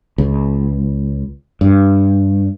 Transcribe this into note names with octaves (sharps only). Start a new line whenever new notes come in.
C#2
G2